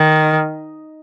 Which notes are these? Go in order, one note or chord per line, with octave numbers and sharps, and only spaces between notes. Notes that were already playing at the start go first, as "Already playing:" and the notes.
Already playing: D#3